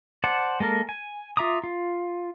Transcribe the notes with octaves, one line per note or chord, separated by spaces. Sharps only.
C5 D5 F#5 A5
G#3 A#3 A4 A#4
G#5
F4 E5 A#5 D6 D#6
F4